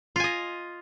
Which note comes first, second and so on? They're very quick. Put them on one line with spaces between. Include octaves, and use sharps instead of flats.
F4 G#5 D#5